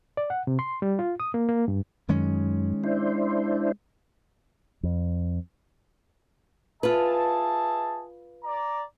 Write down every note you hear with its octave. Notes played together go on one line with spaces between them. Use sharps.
D5
F#5
C3
C6
G3
F4
D#6
A#3
A#3
G2
F#2 D#3 G#3 C#4
D4 E4 C5
F2
F4 G#4 B4 E5 A5
D5 A#5